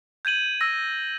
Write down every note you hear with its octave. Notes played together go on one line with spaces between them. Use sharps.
G6 G#6 D#7 F#7
E6 A#6